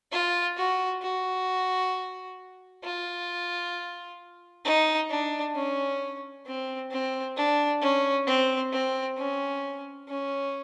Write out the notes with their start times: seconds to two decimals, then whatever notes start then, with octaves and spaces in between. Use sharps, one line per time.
0.12 F4
0.57 F#4
1.02 F#4
2.84 F4
4.65 D#4
5.10 D4
5.55 C#4
6.46 C4
6.91 C4
7.36 D4
7.81 C#4
8.27 C4
8.72 C4
9.18 C#4
10.08 C#4